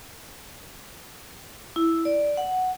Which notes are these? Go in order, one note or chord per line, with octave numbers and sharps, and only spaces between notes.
E4
D5
F#5